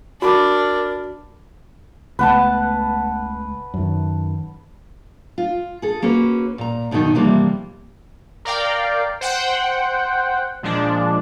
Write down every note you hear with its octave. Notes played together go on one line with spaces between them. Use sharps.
D4 F#4 A#4 B5 D6
C#2 A3 B3 B4 F#5 A5
F#2 D#3
F4
G#4 A4
A#3 C#4 F#4 B4
A#2 A#5
F#2 B2 D3 D#3 D#4
C3 E3 F3 G3 A#3
A#4 D5 F5 G5
C5 F#5 G5
A#2 F3 G#3 D4